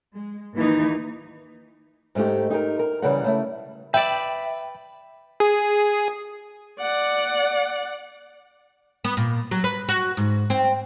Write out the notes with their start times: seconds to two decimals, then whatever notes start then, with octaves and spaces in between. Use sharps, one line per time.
0.14 G#3
0.55 D#2 E3 D#4
2.15 G#2 G#3 A3 D#4 G4
2.50 D#4 G4 G#4 A#4
2.79 A#4
3.02 C#3 E3 G3 A#4 F#5
3.24 C#3 A3 E4
3.94 B4 D5 E5 G5
5.40 G#4
6.81 D5 F#5
9.05 B3
9.17 A#2
9.51 F#3
9.64 B4
9.89 F#4
10.17 G#2
10.50 C4